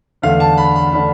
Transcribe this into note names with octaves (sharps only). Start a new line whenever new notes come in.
E2 D3 A3 D4 F5
A5
B5
B5
D3 A3 D4 B5